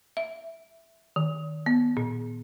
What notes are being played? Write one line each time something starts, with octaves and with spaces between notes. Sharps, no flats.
E5
D#3
B3
A#2